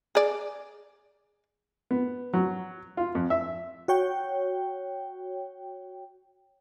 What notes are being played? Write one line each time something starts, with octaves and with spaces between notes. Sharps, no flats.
G#4 D5
B3
F#3
F4
F2
E5
F#4 C#5 G5